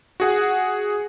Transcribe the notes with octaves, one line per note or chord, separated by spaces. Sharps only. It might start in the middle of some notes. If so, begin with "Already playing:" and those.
F#4 G#4 F#5